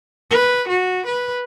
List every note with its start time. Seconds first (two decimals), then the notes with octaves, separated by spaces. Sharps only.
0.30 B4
0.68 F#4
1.06 B4